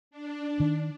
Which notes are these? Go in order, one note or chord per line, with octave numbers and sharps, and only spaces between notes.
D4
D#3